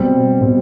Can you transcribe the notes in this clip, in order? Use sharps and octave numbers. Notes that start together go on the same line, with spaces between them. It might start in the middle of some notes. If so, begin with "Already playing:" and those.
Already playing: B2 G3 C4
B2 G3 C4